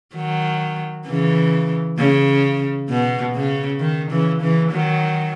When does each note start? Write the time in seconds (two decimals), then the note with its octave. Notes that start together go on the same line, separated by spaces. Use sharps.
0.16 D#3 F#3
1.07 C#3 E3
1.98 C#3
2.90 B2
3.35 C#3
3.80 D#3
4.11 C#3 E3
4.41 C#3 E3
4.71 D#3 F#3